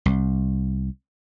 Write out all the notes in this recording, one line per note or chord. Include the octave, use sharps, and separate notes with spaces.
C2